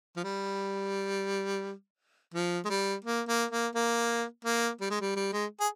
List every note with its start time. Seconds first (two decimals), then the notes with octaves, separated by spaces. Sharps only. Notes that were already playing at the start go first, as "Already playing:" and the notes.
0.16 F3
0.24 G3
2.34 F3
2.65 G#3
2.70 G3
3.05 A#3
3.28 A#3
3.51 A#3
3.75 A#3
4.45 A#3
4.81 G3
4.90 G#3
5.01 G3
5.16 G3
5.32 G#3
5.60 G#4